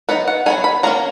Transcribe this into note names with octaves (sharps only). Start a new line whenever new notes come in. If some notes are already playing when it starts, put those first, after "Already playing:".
F#3 B3 D#4 B4
F#5
F#3 B3 D#4 G#5
B5
F#3 A#3 C#4 A#5